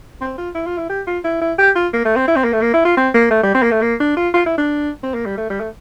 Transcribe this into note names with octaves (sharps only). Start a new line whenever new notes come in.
C4
F4
E4
F4
E4
G4
F4
E4
E4
G4
F4
A#3
A3
C4
E4
C4
A#3
A3
A#3
E4
F4
C4
A#3
A3
G3
C4
A#3
A3
A#3
D4
F4
F4
E4
D4
C4
A#3
G3
A3
G3
A3